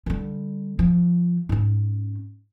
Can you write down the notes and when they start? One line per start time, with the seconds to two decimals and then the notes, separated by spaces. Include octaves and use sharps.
0.06 D3 G3
0.79 F3
1.49 G#2 C#4